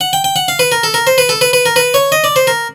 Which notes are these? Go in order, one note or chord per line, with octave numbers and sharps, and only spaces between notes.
F#5
G5
G5
F#5
F5
B4
A#4
A4
A#4
C5
B4
A4
B4
B4
A#4
B4
C#5
D#5
D5
C5
A#4